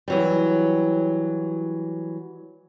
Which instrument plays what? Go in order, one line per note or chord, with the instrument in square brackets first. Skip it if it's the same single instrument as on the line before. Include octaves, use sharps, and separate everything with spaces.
[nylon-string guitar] E3 F#3 G3